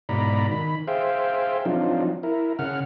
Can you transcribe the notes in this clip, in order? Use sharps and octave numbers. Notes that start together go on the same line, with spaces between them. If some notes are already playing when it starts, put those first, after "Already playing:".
G#2 B2 D5 A#5 B5
D#3 B5
G#4 C5 E5 F5 G5
F3 F#3 C4 D4 D#4 F4
E4 A#4
C#3 F#5 F6